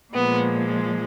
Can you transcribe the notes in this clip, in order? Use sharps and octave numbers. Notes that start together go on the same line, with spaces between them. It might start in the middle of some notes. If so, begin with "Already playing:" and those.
A#2 F3 G#3 B3